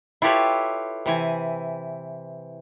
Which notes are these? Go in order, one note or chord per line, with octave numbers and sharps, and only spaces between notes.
E4 F4 G4 A4 B4 C#5
C3 E3 G#5